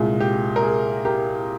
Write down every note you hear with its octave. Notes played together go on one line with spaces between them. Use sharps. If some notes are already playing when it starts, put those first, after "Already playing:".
Already playing: C2 A#2 G#3 G#4
G4
A#4
G#4
G4 A#4